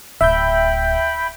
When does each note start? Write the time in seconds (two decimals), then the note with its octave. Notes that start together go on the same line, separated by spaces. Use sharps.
0.21 D1 E5 G5 B5 G6